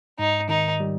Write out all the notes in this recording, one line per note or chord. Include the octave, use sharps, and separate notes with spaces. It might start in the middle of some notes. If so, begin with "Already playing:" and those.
G#2 D#4
D#3 D#4
G3